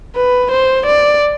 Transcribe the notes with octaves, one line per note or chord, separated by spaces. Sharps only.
B4
C5
D5